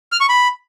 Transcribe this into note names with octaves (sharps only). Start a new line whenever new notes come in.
F6
C#6
B5